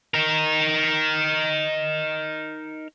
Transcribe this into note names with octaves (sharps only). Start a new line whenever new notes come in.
D#4 A#4